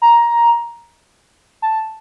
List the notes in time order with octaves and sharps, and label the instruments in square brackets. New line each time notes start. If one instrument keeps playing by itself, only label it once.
[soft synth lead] A#5
A5